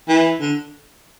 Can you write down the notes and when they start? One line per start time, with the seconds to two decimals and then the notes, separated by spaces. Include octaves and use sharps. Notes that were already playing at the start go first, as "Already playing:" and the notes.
0.08 E3
0.41 D3